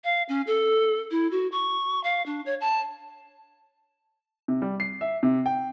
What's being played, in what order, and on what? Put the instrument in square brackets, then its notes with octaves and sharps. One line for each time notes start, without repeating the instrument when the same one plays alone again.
[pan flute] F5
C#4
A4
E4
F#4
C#6
F5
D4
C#5
A5
[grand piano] C3
G3
C7
E5
C3
G5